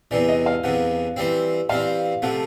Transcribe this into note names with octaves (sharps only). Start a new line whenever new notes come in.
E2 C3 E3 D5
D#5
F5
E2 C3 E3 F#5
E3 G3 C4
E3 G3 C4 F5
C3 F3 A3 F#5